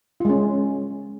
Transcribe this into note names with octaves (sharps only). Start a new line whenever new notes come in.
G#3 C#4 F4